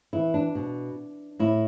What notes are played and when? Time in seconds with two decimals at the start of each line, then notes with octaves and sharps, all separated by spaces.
0.13 E3 E4
0.34 D4
0.55 B2
1.39 A2 E4